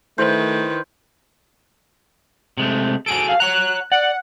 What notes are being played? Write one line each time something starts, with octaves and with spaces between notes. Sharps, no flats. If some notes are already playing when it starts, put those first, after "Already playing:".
D#3 A3 E4 B4 C5
C3 G#3 A3
F#4 G#4 A4 D7
F5
C#5 F#5 A#5 F#6
D5 F#5